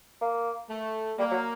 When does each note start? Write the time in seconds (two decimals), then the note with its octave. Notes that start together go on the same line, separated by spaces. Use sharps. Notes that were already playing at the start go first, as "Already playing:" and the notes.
0.21 A#3
0.69 A3
1.18 G3 A#3
1.31 F#3